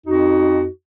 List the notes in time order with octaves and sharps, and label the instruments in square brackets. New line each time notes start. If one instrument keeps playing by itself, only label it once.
[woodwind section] F2 D#4 F#4